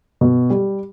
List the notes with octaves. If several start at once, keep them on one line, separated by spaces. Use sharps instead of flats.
B2
G3